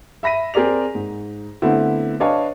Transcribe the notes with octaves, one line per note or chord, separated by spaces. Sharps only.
E5 B5 A#6 B6 D#7
C4 G#4 A#4 D5 F7
G#2
D3 A3 B3 C4 E4
D4 B4 C#5 D#5 F5 A5